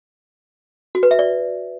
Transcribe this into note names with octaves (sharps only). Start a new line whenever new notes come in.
F#4
B4
E5
D5